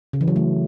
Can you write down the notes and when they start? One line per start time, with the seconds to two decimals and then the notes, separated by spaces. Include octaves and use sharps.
0.13 C#3
0.21 E3
0.28 F#3
0.36 A3